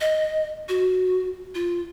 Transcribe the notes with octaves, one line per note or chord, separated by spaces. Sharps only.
D#5
F#4
F4